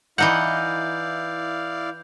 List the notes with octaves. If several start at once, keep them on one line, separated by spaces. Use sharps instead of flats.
E3 D#4 E4 D5 F5 F#5 G6